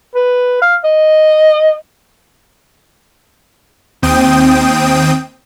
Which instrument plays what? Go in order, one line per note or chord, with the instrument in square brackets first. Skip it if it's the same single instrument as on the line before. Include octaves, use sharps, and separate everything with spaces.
[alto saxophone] B4
F5
D#5
[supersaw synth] D#2 C4 G5 D#6